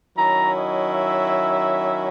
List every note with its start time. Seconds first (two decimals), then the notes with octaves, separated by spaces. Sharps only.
0.16 D#3 F#3 C#4 E4 A#5
0.55 D#5
0.92 E5